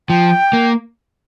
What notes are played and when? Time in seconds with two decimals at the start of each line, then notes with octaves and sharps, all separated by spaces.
0.09 F3 G5
0.53 A#3